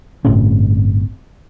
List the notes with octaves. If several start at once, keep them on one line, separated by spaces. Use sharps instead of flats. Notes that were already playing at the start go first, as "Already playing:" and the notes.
G1 A2 C3 C#4